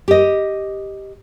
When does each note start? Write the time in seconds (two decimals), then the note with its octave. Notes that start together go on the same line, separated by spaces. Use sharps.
0.08 G4 D#5